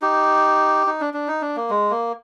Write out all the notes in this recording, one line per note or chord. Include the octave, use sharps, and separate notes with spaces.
D#4 G4
D#4
D4
D4
D#4
D4
A#3
G#3
A#3